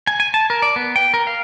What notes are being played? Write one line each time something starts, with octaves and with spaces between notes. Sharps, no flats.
G#5
G#5
A5
A#4
D5
B3
G5
A#4
F5